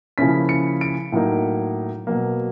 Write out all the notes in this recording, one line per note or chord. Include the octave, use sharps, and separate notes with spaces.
C#3 F3 A#3 C#4 E4 B6
C#7
D7
A2 F#3 A#3 D#4
B2 F#3 A#3